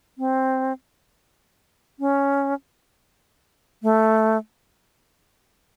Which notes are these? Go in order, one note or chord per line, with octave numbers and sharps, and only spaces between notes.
C4
C#4
A3